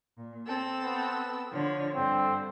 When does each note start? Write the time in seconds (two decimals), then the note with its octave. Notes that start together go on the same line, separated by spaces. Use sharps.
0.17 A#2
0.46 C4 A4 E6
0.83 B3
1.52 D3 F3 C#5
1.94 G2 D3 C4